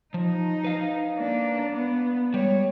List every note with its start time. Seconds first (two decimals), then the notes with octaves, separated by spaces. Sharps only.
0.14 F3 D#4
0.64 B4 F5
1.17 A#3 D4
1.69 B3
2.34 G3 G#3 C#5